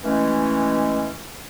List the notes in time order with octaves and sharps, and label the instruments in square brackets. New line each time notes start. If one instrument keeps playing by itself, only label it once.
[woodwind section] E3 G#3 A3 C#4